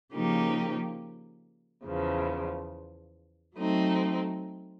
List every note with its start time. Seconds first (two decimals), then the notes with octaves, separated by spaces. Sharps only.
0.14 C#3 F3 A#3 D#4 G4
1.85 E2 C#3 F3
3.56 F#3 A3 C4 D#4